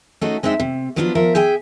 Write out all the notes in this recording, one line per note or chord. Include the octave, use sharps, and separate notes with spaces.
A3 C#4 D#4 F#4 G#4
G#3 C4 D4 D#4 E5
C3
F3 F#3 B3 D4 D#4 F4
F3 A#4 E5
G#4 E5 G5 G#5